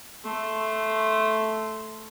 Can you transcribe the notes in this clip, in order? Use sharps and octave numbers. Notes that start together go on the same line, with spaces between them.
A3 C6